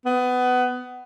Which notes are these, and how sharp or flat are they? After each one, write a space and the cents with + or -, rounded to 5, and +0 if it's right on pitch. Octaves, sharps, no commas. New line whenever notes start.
B3 +20